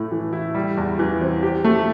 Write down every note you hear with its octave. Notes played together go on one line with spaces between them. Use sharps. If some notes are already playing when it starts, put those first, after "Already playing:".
Already playing: A2 A3
E3
E4
G3
E2
E3
C4
G4
A3